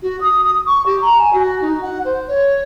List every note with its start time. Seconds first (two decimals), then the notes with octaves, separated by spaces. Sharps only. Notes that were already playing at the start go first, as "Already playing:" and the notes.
0.02 F#4
0.20 D#6
0.43 D#6
0.66 C#6
0.86 G4
1.01 A#5
1.17 G#5
1.32 F#4
1.62 D#4
1.81 F#5
2.04 C5
2.27 C#5